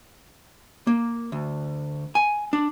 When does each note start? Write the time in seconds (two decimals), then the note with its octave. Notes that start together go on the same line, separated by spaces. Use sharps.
0.87 A#3
1.32 D2
2.15 G#5
2.53 D4